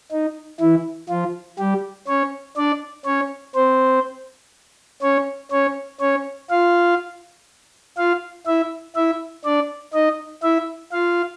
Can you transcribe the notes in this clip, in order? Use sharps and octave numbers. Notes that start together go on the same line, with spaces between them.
D#4
E3 E4
F3 F4
G3 G4
C#4 C#5
D4 D5
C#4 C#5
C4 C5
C#4 C#5
C#4 C#5
C#4 C#5
F4 F5
F4 F5
E4 E5
E4 E5
D4 D5
D#4 D#5
E4 E5
F4 F5